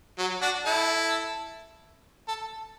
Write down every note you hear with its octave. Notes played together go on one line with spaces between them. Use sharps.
F#3
D4 F#4
E4 A4
A4